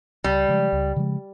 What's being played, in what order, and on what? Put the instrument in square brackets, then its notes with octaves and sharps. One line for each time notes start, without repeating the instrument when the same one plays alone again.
[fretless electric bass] C#2 [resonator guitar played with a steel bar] G3
[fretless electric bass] C#3 F3 G#3
C#2
C#3 F3 G#3